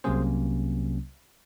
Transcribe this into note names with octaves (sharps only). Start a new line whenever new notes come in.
C2 C3 F#3 A#3 C#4 G#4 C5